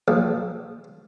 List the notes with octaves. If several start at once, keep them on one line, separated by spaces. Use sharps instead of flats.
A#1